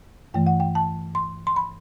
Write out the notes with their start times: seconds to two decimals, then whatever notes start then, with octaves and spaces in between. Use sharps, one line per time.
0.34 G2 E3 A3 G5
0.47 F#5
0.60 G5
0.75 A5
1.15 C6
1.47 C6
1.56 B5